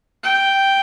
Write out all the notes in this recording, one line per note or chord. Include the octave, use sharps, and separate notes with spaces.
G5